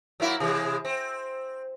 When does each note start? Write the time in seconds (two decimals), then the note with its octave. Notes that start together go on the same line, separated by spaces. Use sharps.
0.20 F#3 A#3 E4
0.40 C3 E3 G#3
0.85 C4